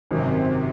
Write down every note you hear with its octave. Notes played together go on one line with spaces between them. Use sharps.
G#1 F#2 C3 D#3 F#3